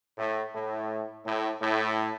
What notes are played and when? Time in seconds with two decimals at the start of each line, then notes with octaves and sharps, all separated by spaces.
0.18 A2
0.54 A2
1.25 A2
1.61 A2